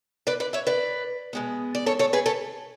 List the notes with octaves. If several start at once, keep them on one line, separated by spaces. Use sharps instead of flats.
B4 D5
B4 D5
C#5 E5
B4 D5
B2 G#3 B3
D5
A4 C#5
A4 C#5
G#4 B4
A4 C#5